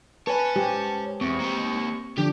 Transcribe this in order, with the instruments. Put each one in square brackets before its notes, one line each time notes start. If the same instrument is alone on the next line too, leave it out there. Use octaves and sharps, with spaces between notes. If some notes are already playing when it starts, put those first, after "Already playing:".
[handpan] B4 [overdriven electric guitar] C#5 G#5 [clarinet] A5
[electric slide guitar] G#3 C5 [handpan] G4
[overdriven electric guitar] E2 [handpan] C4 [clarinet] C#6
[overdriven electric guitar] A#3 G4
[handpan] D3 F3 D4 [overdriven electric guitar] G4